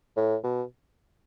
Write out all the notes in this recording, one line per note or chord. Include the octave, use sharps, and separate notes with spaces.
A2
B2